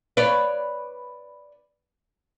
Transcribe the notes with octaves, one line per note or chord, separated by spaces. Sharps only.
B4 C#5 D5